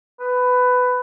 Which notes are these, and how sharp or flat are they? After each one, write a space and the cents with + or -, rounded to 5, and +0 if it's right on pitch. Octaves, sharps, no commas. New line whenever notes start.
B4 +15